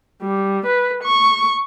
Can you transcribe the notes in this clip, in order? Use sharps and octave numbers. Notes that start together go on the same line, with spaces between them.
G3
B4
C#6